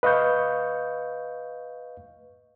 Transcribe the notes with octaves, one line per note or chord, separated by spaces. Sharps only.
B4 D#5 F5 C#6 G6